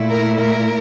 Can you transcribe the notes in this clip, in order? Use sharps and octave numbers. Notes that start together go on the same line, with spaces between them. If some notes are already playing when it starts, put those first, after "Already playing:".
Already playing: A#2 A3 E4
A#4
A#4